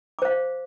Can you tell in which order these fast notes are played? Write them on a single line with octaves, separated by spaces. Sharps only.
D6 C5 F5